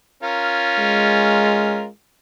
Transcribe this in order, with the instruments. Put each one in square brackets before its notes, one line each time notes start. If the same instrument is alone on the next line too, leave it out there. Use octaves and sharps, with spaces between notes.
[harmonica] C#4 F4 A#4
[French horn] G#3